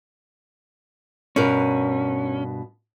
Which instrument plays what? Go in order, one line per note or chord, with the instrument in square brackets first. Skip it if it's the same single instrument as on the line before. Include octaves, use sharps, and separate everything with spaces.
[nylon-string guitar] G2 B2 A#4 [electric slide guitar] C#4